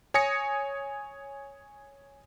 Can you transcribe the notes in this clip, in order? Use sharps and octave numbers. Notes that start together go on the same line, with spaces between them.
C#5 G#5 D#6 A#6 C#7